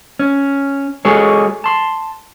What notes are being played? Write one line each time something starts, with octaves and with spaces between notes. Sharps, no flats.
C#4
G#3 F#4 G#4 A4 C#5
A5 C6